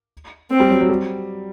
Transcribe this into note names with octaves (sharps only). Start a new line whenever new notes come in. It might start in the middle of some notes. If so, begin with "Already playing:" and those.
C4
G3
F#3
F#3
G3